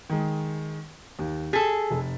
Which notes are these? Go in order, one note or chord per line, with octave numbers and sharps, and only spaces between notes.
D#3 G#3
D#2
G#4 A4 A6 B6
F1